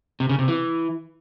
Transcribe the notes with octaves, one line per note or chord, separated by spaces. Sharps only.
C3
C#3
C3
E3